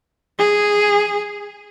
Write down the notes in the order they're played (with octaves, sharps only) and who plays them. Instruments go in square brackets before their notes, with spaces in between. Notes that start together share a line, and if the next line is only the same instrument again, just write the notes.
[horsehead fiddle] G#4